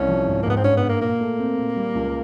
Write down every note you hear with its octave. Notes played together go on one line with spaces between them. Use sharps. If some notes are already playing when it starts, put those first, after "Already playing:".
Already playing: C2 C#4
F3
G#2
A#3
G#2 B3
C4
G2 C#4
B3
G2
A#3
A#2 A#3
A3
C4
A#2
G3
C#2